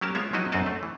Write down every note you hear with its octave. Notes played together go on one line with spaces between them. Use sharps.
F#3 G3 C#4 G4 A#4 A5
G#3 B3 F4 C#5 E5
F3 F#3 D#4 E4 F#4 D#5
F#2 C4 D4 F#4 D#5 A5
A3
E3